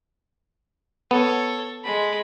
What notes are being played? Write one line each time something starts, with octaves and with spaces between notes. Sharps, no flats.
B3 A4 C#5
G#3 B5